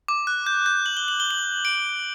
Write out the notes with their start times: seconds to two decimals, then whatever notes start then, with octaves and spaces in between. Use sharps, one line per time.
0.08 D6
0.27 F#6
0.46 G6
0.66 G6
0.86 F#7
0.97 G7
1.08 F#7
1.20 G7
1.31 F#7
1.65 D7